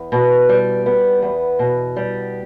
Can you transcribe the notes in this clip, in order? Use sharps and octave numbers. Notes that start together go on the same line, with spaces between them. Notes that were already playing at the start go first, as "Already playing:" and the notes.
Already playing: E2
B2
G3
B3
E2
B2
G3